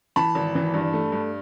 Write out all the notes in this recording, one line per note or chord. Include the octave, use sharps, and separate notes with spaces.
E3 A5 B5
G#1
E3
G2
A3
G2